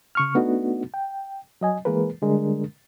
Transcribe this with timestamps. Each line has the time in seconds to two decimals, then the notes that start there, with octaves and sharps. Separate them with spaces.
0.15 C#3 C#6 F6
0.35 A3 B3 D4 D#4 F#4
0.94 G5
1.61 F#3 D#5 G#5
1.85 E3 G#3 A#3 G#4 A#4 B4
2.22 D3 G3 G#3 D4 A#4